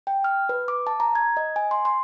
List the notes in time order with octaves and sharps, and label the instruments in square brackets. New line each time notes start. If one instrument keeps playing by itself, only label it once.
[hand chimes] G5
F6
B4
D6
A5
A#5
G#6
D#5
G#5
C6
C6